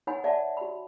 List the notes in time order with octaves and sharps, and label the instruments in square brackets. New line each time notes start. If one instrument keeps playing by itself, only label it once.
[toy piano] D#4 C#5 F#5 G#5 B5
D5 E5 F#5 A5
F#4 B5